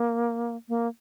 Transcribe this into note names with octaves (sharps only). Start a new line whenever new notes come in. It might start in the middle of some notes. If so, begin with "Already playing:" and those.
Already playing: A#3
A#3